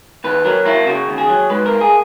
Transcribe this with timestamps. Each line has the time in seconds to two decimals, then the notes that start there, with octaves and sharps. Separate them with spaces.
0.24 D#2 B4
0.45 F#3 A#4
0.65 A#3 E4
0.86 C#3 F#4
1.08 D#2
1.18 G#4
1.29 F#3
1.50 G#2 B4
1.66 A#3 A#4
1.81 G#4